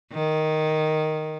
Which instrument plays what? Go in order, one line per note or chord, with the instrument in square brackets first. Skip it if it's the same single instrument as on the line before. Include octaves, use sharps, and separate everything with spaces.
[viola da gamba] D#3